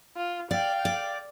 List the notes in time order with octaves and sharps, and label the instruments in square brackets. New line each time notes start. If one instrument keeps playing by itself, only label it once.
[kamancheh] F4
[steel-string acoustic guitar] D5 [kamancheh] F5 G5
[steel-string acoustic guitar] D5